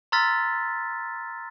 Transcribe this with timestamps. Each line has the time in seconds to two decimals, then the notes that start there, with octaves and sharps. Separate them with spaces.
0.12 A#5 C6 E6 F6 A6 B6